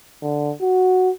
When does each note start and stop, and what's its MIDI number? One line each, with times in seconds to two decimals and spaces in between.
0.22 0.52 50
0.61 1.10 66